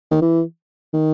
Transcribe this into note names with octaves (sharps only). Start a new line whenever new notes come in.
D#3
E3
D#3